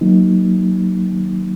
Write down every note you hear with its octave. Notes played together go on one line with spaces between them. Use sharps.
F#3 A#3 D#4